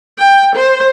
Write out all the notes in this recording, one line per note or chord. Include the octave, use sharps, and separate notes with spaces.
G5
C5